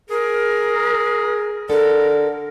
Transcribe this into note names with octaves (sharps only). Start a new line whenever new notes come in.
G#4 A#4
D3 A4 A#4